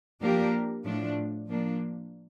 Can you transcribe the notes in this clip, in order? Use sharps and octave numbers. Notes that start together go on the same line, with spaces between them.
F3 A#3 D4 G4 A#4
A2 F3 A3 D4
F3 A#3 D4